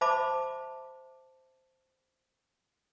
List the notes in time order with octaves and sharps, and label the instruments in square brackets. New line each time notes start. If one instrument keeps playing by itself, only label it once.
[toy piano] C5 E5 A5 B5 D6